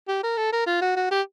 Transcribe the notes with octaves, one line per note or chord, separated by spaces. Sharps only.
G4
A#4
A4
A#4
F4
F#4
F#4
G4